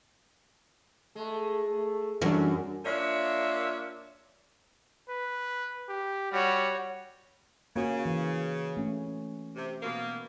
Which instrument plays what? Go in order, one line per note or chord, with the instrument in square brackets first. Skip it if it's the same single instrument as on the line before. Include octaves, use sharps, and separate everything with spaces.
[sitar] G#3 [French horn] A3
[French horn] A3
[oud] F#2 [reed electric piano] E3 G3 D4 [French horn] A3
[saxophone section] A#3 D4 F4 C#5 E5
[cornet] B4
G4
[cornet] G3 [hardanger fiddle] F#4 C#5
[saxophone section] C#3 [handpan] A#3 F#4
[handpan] E3
A3 C#4
[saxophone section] C3
B2 A#3